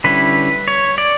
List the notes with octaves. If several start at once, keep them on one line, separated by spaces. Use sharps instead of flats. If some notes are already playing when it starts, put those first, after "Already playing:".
D3 G3 C#4 E4 B4
C#5
D5